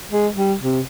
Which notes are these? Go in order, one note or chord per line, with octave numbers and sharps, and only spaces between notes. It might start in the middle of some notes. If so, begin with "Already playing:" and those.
G#3
G3
C3